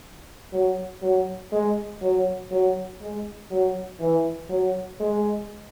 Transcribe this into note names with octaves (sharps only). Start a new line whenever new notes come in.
F#3
F#3
G#3
F#3
F#3
G#3
F#3
E3
F#3
G#3